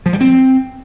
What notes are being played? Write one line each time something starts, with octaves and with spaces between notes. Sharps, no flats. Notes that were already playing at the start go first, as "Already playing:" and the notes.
F3
G3
C4